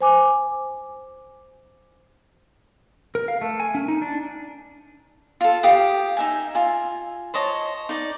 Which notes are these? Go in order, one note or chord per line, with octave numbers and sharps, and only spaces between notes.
C5 G#5 D6
A#4
F5
A3
G#5
C#4
D#4
D4
F4 A4
G4 F5 G5 D#6
D#4 E5 G#5
F4 G#5
C5 C#5 D#5 A5
D#4 D5